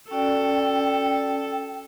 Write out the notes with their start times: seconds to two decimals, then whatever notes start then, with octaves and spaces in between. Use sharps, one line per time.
0.11 C#4 F#4 A4 D5 G5